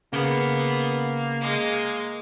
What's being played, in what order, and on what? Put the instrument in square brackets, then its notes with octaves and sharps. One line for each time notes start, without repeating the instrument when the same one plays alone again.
[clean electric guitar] C#3 [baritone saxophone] A#3 [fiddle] B3
[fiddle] G#3